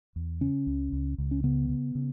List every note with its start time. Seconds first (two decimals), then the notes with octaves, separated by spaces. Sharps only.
0.16 E2
0.41 C#3 C#4
0.67 C#2
0.93 C#2
1.18 C#2
1.31 C#4
1.44 C#3 B3
1.69 C#3
1.95 C#3